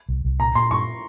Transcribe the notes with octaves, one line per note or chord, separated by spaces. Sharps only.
C2
C2
A#2 A#5
A#2 C6
G2 C#6